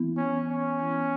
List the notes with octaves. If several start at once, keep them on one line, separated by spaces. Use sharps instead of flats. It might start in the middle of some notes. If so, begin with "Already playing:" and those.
Already playing: E3 B3 E4
C#4
C#4
E3 B3 E4